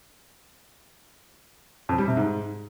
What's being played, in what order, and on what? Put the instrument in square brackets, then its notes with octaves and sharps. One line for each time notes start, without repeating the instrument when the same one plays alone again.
[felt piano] F2
G3
C3
G#2